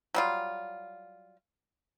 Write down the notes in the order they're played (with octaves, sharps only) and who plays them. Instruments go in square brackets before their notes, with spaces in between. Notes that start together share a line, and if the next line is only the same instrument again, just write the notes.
[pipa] F#3 G3 F4